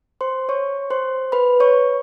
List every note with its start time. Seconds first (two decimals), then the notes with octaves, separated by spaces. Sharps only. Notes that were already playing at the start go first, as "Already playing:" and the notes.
0.21 C5 C6
0.49 C#5 C#6
0.90 C5 C6
1.32 B4 B5
1.60 C#5 C#6